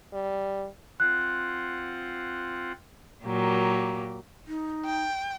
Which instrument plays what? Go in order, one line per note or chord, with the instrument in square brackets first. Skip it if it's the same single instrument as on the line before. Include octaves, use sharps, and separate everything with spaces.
[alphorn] G3
[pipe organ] C4 F4 F#5 [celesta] F#6
[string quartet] A#2 F#3 A#3 G4
[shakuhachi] D#4
[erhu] G5